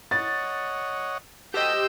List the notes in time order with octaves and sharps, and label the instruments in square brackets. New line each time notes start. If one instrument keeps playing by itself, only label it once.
[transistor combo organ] C#5 D#5 F#5 [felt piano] A6
[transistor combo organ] F#4 A4 [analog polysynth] G4 C5 D#5 [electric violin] E6 G6